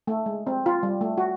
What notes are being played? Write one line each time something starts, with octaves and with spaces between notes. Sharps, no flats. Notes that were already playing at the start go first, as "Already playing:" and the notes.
A3
G#3
C4
F4
G3
A3
F#4